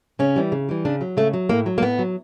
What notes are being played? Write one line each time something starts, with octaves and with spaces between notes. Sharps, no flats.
C#3 C#4
E3 G3
C#3
E3 G3
C#3 D4
F#3
C#3 A3
F#3
A2 A#3
F#3
A#3
A2 B3
F#3